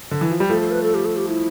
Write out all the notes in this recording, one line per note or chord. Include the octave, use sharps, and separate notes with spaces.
D3
E3
F3
G3
F3 A3 A4
A4
B4
A4
G4
A4
G4
E4